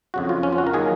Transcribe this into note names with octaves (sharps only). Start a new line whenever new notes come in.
F2 C#3 F#3 F#4
F4
C#4
F4
F#4
A#4
D#3 F#3 A#3 G#4